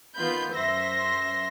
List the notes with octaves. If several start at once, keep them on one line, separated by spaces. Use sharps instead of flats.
D#3 B3 F4 B5 G6
F#2 C5 E5 C6 A#6